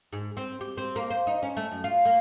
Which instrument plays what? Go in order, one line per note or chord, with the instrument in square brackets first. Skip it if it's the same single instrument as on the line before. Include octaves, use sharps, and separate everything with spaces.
[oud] G#2
C4
G4
C4
A#3
C5
D#4
C#4
A3
F#2
F4
A#3